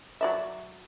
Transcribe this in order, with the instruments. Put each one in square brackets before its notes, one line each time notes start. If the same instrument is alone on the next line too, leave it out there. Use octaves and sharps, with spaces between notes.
[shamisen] F#3 D5 E5